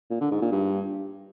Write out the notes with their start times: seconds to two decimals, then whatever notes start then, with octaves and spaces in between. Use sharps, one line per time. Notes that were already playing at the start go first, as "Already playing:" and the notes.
0.11 A#2
0.21 D3
0.31 G#2
0.42 A#2
0.52 G2